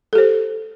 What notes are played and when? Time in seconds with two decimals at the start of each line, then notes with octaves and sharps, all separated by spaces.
0.13 A4
0.15 G4
0.18 C5